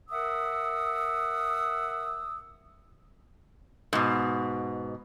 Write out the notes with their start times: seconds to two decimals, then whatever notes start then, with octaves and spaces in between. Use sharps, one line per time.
0.10 A#4 E5 F#5 D#6 E6
3.93 G#2 B2